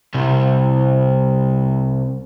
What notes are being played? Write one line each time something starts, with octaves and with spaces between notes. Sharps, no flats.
C2 C3